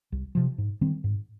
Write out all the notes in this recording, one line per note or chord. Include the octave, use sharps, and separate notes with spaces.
C2
C3 F3
G#2
D#3 G3 C4
G#2